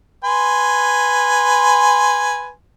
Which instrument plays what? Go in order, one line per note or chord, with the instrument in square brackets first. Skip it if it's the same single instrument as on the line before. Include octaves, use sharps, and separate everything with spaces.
[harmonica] B4 G#5 C6